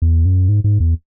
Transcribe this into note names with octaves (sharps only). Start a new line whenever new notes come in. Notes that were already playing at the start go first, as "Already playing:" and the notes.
E2
F#2
G#2
G#2
E2